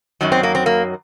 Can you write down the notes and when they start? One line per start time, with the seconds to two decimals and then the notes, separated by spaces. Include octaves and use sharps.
0.21 F#2 D#3 F#3
0.32 C4
0.43 A#3
0.55 C4
0.66 A#3